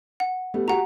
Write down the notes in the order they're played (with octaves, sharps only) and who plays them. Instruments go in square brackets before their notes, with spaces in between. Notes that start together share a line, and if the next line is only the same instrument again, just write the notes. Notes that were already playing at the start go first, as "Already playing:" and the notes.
[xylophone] F#5
[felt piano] G3 A3 B3
[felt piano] F#4 G4 [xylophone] F#5 A#5